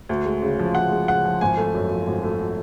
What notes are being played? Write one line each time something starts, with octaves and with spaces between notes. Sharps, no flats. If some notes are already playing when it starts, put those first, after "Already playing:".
D2
G#3
C#3
F3
D2 F#5
G#3
C#3 F#5
F3
G#1 G#5
A3
F#2
F3
G#1
A3